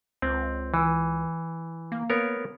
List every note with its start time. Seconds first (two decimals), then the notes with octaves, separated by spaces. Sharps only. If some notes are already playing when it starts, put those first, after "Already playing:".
0.22 C#2 C4
0.74 E3
1.92 A#3
2.10 B3 A#4 C#5